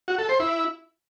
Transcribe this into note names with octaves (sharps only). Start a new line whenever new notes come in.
F#4
A4
C5
E4